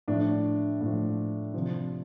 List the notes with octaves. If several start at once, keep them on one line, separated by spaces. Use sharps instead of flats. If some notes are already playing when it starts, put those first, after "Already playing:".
A2 F3 D4
A2 F3
C3 F3